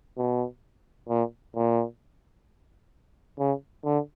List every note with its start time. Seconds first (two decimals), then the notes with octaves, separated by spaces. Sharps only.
0.17 B2
1.09 A#2
1.55 A#2
3.39 C#3
3.84 D3